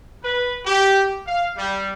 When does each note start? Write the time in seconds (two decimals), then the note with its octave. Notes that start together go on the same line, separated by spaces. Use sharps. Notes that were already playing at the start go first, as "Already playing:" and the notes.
0.23 B4
0.66 G4
1.27 F5
1.56 G3